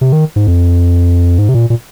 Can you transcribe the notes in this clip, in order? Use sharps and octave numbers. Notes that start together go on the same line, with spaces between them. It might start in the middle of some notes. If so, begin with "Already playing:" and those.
C3
D#3
G#2
F2
G#2
C3
A#2
A#2